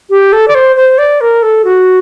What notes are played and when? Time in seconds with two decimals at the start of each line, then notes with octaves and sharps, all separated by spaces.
0.10 G4
0.33 A4
0.48 D5
0.55 C5
0.76 C5
0.98 D5
1.21 A#4
1.43 A4
1.65 F#4